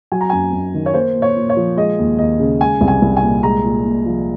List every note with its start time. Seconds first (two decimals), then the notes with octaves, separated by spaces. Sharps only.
0.12 F#3 G#5
0.21 A#5
0.30 F#2 G#5
0.53 F#2
0.74 D#3
0.86 C#5
0.94 A#3 C5
1.15 A#2
1.22 C#5
1.36 A#2
1.50 C#5
1.57 F3
1.77 G#3 D#5
1.99 D#2
2.18 D#2 D#5
2.40 C#3
2.61 G#3 G#5
2.81 C2
2.88 G#5
3.02 C2
3.17 G#5
3.22 A#2
3.43 G#3 A#5
3.64 A#2
3.85 A#2
4.06 F3